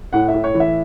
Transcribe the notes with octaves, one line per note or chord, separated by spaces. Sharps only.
A2 F#5
E5
A2
C#5
E3
E5